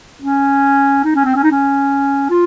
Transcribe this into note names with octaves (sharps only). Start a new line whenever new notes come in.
C#4
D#4
C#4
C4
C#4
D#4
C#4
F4